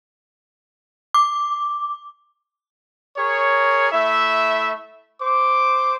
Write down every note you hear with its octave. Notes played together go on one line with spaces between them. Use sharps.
D6
G#4 A#4 C#5
A3 E4 E5
C5 D6